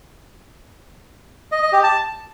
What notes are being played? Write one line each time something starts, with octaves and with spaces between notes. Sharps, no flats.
D#5
D#5
G4
A5